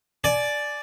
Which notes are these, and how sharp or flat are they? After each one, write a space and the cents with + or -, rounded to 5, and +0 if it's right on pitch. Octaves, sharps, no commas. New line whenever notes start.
D5 +0 G#5 +30